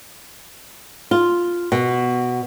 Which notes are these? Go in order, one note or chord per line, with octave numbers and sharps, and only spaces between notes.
F4
B2